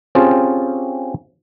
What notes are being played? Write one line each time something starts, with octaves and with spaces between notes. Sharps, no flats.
C4 C#4 F4 G4 G#4 A5